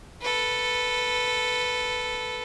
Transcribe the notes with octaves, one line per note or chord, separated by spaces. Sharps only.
A4 B4